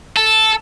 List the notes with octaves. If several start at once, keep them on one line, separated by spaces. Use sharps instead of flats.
A4